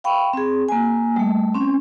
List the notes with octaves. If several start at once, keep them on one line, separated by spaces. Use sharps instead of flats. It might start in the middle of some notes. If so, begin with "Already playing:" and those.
F5 G5 B5 C#6
C4 G#4
A#3 G#5
G3 A3
C4 C#4